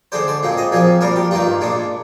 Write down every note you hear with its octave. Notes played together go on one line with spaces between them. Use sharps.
D3 G#3 D4 C5
D5
A#2 G#3 C4
D#5
A#2 F3 C4 G#4
A#2 G3 D4 A#4
G4
G2 D#3 A#3 F4
A#2 G#3 D4